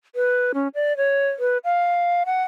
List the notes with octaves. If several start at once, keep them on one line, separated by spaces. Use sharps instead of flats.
B4
C#4
D5
C#5
B4
F5
F#5